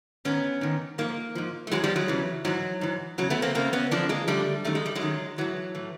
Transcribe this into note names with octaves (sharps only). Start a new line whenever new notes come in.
G#2 D#3 B3 C#4
G#2 D#3
G#2 F3 A#3
G#2 F3
A3
E2 C#3 E3 F#3 G#3
F3 G3
F#3 G#3
E2 C#3 E3
G#2 E3 F#3
G#2 E3
E2 C#3 F#3
A3 B3
A#3 C4
E2 C#3 A#3 C4
B3 C#4
F#2 D3 F3 C4 D4
G#3 A#3
F#2 D3 F3 G3 A3
F#2 D#3 A3
G#3
G3
F#3 G#3
F#2 D#3
A2 E3 F#3
A2 E3